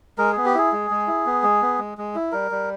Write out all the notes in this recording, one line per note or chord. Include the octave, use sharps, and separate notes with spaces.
G#3 A#4
B3 G#4
G4
E4 G#4
G#3
G#3
E4
B3
G#3
B3
G#3
G#3
E4
G3 A#4
G3